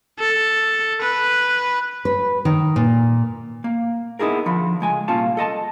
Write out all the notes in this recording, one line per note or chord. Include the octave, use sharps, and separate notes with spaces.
A4
B4
B4
D#3
A#2
A#3
B3 D#4 E4 G#4 A#4
D3 F3 B5
C#2 G#3 G#5
C2 A#2 A#3 C#4 F4 A5
A4 D#5 A5